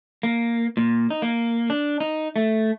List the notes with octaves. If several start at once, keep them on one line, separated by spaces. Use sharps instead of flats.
A#3
A#2
D#4
A#3
D4
D#4
A3